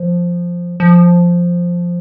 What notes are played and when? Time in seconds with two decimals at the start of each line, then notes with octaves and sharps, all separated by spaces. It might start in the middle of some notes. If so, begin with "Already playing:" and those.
Already playing: F3
0.80 F3